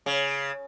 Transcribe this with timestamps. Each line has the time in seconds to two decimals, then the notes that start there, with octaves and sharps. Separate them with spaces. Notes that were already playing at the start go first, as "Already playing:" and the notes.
0.06 C#3